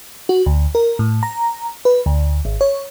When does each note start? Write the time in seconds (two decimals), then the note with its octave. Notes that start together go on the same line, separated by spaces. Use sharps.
0.29 F#4
0.46 D2
0.75 A#4
0.99 A2
1.23 A#5
1.85 B4
2.06 D2
2.45 G#1
2.61 C#5